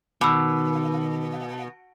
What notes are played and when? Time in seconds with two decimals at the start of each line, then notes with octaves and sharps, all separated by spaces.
0.21 B2 D#3 D6 E6